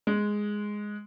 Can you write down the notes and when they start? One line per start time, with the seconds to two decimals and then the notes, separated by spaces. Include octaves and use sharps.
0.07 G#3